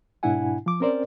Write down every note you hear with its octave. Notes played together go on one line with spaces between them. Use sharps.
G#2 B2 D4 E4 F#5 G#5
F3 D6
C4 C#4 A#4 C5 D5